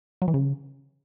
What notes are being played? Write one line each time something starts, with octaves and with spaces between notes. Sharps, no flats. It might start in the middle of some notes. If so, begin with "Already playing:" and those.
F#3
E3
C#3